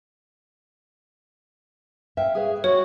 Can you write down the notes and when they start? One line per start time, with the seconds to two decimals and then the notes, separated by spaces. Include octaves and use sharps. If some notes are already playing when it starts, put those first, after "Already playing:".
2.17 E5 F5 G5
2.35 G#4 B4 C#5
2.64 F#4 C#5